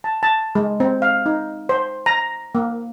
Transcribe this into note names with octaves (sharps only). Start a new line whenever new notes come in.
A5
A5
G#3
C4
F5
D#4
C5
A#5
A#3